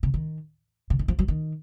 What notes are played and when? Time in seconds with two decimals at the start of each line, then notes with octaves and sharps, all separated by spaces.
0.03 C#3
0.14 D#3
0.90 C#3
0.99 D#3
1.08 F3
1.19 F#3
1.28 D#3